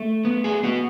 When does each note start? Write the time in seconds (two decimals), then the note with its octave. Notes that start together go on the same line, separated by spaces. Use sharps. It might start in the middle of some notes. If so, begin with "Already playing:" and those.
Already playing: A3
0.25 B3
0.44 G#4
0.63 B3 F#4